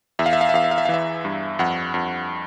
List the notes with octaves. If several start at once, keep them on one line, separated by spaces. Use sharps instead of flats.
E2 E5
F5
E5
F5
E5
E2 F5
E5
F5
E5
F5
E3 E5
G2
F2 F#5
F2